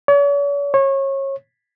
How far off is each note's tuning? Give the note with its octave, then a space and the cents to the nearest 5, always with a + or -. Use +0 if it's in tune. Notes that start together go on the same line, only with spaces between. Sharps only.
C#5 +45
C#5 -25